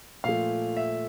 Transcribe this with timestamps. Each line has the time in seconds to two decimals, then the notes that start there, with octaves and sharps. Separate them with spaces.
0.24 A#2 F3 A3 F5
0.77 E5